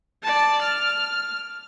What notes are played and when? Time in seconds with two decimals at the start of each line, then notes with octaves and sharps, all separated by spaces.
0.23 D5 A5
0.62 F6